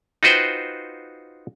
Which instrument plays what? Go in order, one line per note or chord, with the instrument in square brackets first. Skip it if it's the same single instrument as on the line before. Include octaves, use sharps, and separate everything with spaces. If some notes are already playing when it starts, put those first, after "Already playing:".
[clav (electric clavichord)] D#4 F4 F#4 B4 C5 G5